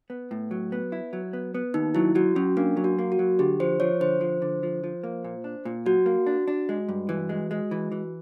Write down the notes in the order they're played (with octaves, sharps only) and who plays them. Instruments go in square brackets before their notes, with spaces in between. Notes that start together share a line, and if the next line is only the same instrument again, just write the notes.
[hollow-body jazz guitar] B3
A2
F#3
B3
E4
F#3
B3
B3
[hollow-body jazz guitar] D#2 [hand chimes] D#4
[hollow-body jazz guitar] F#3 [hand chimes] E4
[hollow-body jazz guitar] F#3 [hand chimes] F#4
[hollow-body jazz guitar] F#3 [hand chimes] C#4
[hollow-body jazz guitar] A#3 [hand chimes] D4
[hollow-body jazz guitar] F#3
[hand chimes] F#4
[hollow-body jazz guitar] A#3
[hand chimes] F#4
[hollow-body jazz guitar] F#3
[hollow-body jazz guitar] D3 [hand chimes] G4
[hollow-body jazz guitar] F3 [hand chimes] C5
[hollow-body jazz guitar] F3 [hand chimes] C#5
[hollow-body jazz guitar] D3 [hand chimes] C5
[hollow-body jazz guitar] F3
D3
F3
F3
A#3
A#2
D4
A#2
[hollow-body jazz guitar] F#3 [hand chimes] F#4
[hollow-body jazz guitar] A#3
D4
D4
G#3
G2
E3
G#3
G#3
E3
E3